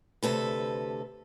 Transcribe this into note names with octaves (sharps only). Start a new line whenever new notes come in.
D2 C3 A4 B4